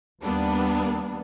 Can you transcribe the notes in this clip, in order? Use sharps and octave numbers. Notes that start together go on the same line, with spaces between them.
D#2 G3 A#3 B3 D4